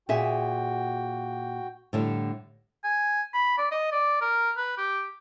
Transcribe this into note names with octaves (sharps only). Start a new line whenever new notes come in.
A#2 F#4 G#4 E5 G5
A2 D3 G3
G#5
B5
D5
D#5
D5
A#4
B4
G4